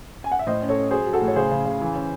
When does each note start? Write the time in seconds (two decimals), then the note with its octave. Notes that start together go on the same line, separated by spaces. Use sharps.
0.24 G#5
0.31 F#5
0.39 E5
0.47 A2 C5 D#5
0.62 C#4
0.69 A4 C#5
0.77 C#4
0.91 F#3 G#4 C5
1.07 F#3
1.13 F#4 A4
1.21 A2
1.28 C#5
1.36 C#3 G#4 C5
1.51 C#3
1.65 C#3
1.81 E3
1.95 C#4